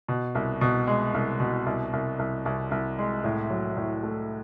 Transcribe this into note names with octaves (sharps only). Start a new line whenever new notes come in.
B2
C2
B2
G#3
C2
B2
C2
C2
C2
C2
C2
G#3
A2
F#3
A2
A3